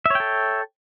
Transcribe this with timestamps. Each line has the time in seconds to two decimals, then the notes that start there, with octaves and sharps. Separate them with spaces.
0.06 E5
0.10 C#5
0.15 G5
0.20 A4